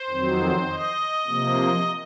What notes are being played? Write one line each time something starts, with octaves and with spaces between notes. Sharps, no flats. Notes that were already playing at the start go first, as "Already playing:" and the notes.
Already playing: C5
F2 D#3 F#3 C4
D#5
C3 F3 A#3